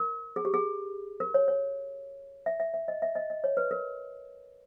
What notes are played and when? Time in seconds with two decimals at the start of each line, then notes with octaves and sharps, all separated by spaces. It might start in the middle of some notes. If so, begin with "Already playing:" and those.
Already playing: A#4
0.36 G#4
0.45 G4
0.54 G#4
1.20 A#4
1.34 C#5
1.48 C#5
2.46 E5
2.60 E5
2.74 E5
2.88 D#5
3.02 E5
3.15 D#5
3.30 D#5
3.44 C#5
3.57 B4
3.71 A#4